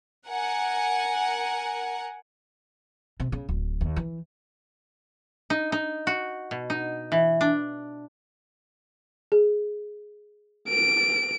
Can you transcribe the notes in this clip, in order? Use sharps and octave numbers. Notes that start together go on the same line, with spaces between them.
A#4 F#5 G#5
C3
C#3
D1
D#2
E3
D#4
D#4
F#4
B2
D#4
E3
D4
G#4
D7